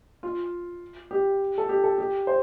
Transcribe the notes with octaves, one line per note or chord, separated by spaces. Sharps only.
F4
G4
A4
G4
A4
G4
C5